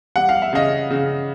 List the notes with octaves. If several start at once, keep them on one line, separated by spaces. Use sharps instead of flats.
G3 F#5
F5
E5
C#3 D#5 F5
C#3